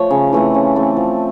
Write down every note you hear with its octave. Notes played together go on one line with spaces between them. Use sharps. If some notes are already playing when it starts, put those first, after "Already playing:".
Already playing: F3 A3 C#5
C#3
E3 A3 C4
C#3
E3 A3 C4
F3